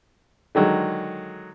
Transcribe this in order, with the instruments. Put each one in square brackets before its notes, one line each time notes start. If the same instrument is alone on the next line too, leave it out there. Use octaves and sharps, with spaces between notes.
[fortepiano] D3 D#3 F#3 G#3